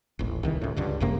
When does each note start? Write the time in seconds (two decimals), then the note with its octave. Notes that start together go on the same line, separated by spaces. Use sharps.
0.19 D#1 A1
0.43 C2 D#3 E3
0.62 C#2 A2
0.77 C#2 G2 D3
1.00 G1 F#2 C3 A#3